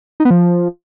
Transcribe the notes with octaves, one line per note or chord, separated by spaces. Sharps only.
D#4
B3
F3